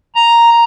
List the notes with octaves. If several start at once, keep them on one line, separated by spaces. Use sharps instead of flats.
A#5